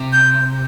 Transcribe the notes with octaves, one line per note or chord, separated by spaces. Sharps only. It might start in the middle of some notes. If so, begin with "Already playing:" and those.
Already playing: C3
G6